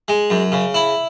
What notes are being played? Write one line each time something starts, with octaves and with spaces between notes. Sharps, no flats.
G#3
F#2
C#3
E4